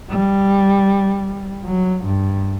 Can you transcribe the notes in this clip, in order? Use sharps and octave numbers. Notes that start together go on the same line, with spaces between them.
G3
F#3
G2